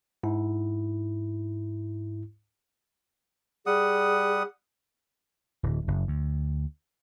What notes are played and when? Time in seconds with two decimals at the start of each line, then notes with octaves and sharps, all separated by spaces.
0.23 G#2 E4
3.66 G3 G#4 F#5 D#6
5.63 D1
5.88 F#1
6.08 D2